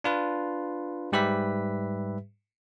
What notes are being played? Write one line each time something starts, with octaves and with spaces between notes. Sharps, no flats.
D4 F4 B4
G#2 G3 G4 B4 E5 B6